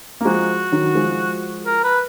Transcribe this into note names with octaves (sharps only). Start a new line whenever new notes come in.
A#3
F3 G#3 F#4
D#3 F#3
F3 G#3
A#4
B4